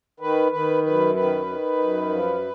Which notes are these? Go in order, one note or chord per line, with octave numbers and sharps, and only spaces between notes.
D#3 B4
D#3 B4
F#2 B4
D#3 B4
D#3
F#2
F3